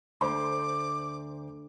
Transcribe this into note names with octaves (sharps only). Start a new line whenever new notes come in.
D2 C5 A5 C6 D6